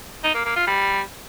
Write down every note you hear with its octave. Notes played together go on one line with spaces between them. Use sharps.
D#4
A#3
A#3
F4
G3